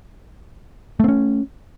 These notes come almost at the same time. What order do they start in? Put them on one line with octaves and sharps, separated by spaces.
A3 C4 C#4